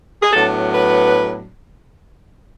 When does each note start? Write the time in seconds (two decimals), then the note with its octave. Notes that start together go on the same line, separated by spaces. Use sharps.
0.22 G#4
0.33 A2 F#3 B3 D4 A4
0.75 B4